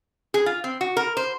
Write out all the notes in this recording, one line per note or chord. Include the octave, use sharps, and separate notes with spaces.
G#4
F4
C4
F#4
A#4
C5